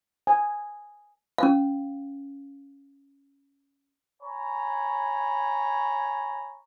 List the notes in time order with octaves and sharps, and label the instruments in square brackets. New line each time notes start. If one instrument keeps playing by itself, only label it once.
[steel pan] G#5
[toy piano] C#4 F5
[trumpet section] C#5 G#5 A#5 B5